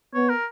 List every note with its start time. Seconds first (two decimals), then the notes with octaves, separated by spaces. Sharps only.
0.14 B3 C#5
0.29 A#4